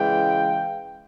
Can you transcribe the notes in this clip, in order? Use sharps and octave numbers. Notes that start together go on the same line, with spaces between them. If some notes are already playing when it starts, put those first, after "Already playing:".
Already playing: C#3 E3 G#3 F5 G5